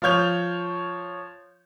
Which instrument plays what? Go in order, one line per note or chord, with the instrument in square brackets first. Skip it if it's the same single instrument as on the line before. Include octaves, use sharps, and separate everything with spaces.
[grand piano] F3 F4 C#5 G6 F7